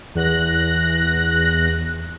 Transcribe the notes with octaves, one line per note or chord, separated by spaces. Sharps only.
E2 F#6 A#6